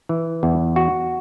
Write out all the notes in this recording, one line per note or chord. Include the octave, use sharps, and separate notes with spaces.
E3
E2
F#4